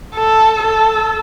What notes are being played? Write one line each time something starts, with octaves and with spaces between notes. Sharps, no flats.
A4
A4